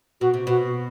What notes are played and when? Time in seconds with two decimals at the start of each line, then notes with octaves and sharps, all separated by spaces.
0.21 B2 F#4
0.34 C3
0.47 B2 F#4